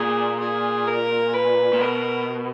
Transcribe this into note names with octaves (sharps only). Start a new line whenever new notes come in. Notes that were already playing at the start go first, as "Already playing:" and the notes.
Already playing: A#2 G#4
G#4
A#4
B4
A#2
B2 A#4